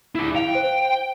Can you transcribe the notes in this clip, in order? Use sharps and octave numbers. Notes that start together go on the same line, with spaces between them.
E4 D5
F5 G5 F7
C5 D7